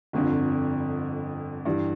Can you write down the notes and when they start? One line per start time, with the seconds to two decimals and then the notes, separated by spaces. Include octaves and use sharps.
0.13 G1 F2 D3
1.65 G2 E3 G3